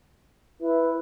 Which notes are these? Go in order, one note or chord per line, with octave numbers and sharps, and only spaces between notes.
E4 B4